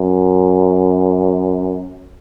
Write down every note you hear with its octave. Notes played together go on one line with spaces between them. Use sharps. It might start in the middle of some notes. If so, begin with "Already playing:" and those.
Already playing: F#2